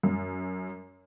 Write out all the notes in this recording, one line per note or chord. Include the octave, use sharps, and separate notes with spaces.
F#2